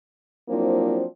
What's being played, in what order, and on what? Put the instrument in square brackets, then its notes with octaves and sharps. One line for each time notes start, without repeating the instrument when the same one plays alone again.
[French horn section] F3 F#3 A#3 C4 D4 E4